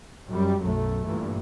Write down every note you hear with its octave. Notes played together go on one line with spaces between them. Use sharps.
F#2 G3
B1 F#2 F#3 A3
G2 A#2 E3